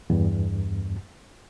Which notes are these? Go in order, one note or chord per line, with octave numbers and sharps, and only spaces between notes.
E2 G2